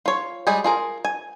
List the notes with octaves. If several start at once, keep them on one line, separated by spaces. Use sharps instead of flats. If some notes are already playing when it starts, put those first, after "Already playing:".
F4 C#5
G3 G#3 G#4 G#5
F4 G#4 A#4
G#5